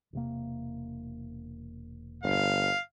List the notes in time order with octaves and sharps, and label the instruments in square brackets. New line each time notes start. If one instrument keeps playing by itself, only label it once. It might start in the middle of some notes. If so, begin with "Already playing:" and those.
[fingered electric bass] E1 C3 A#3
[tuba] G1 [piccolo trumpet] F5